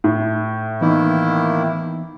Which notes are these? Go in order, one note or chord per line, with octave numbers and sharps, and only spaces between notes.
A2
D#3 E3 A#3 B3 D#4 E4